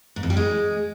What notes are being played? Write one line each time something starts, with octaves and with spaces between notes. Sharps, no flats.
G#2
F2
G3
G#3